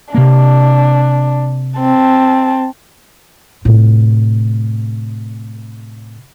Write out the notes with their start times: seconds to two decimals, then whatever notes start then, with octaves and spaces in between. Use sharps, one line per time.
0.14 C3 A#3 D4
1.79 C4 A5
3.65 A2 C3